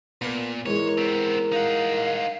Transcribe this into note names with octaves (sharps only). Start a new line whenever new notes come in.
A#2 B3 D4 A#4
G#2 E3 G#3 A#4 C#5
B3 C4
D#4 F5 F#5